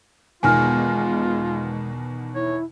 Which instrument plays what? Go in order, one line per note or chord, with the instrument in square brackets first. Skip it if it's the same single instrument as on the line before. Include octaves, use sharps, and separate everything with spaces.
[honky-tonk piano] E2 B2 D#3 [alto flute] G#3 [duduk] F4 [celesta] G#5 F6
[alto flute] E4 [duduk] C#5